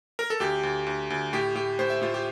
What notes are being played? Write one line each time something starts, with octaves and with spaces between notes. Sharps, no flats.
A#4
A4
D2 G4
D2
D2
D2
A2 G4
A2 G4
A2 C5
E5
A2 F4
G4